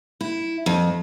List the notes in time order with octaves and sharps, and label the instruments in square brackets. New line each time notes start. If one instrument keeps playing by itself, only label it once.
[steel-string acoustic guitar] E4
F2